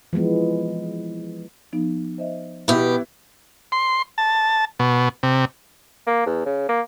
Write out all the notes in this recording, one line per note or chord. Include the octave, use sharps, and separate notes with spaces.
E3 F3 G#3 B3
F3 B3 D#4
C5 D#5 E5
B2 B3 E4 G4
C6
A5
B2
C3
A#3
E2
C#3
A#3